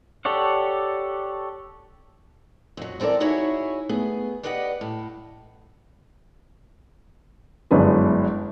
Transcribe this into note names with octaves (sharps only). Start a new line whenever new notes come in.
G4 A4 C#5 D5 F#5
F2 F#3
E3 C4 A4 A#4 D5
D#4 E4 F#4 G#4 C#5 E5
A3 B3 G#4
G4 B4 D5 D#5 F5 F#5
A2
G1 F#2 G#3 D4 E4 B4